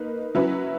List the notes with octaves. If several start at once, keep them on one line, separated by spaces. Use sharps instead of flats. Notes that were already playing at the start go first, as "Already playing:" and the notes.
Already playing: A#3 D#4 B4
F#3 C#4 E4 B4